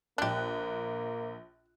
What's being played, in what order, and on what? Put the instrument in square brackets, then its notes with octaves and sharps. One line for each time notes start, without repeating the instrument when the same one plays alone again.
[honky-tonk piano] A#1 F#6 [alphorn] A#3 [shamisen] D4 G4